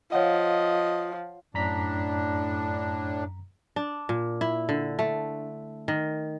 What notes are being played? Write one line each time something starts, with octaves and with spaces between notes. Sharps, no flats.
F3 C#5 D#5 F5 F#5
F#2 A2 D4 A#5 B6
D4
A#2
E4
D3
A3
D#3